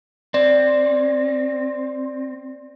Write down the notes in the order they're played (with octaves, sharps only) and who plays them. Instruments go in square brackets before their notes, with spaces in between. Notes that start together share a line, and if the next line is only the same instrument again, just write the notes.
[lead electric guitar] C4 [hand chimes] D5